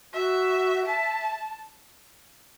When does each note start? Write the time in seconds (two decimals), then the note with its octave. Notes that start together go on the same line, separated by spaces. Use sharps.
0.13 F#4 E5
0.85 E5 A5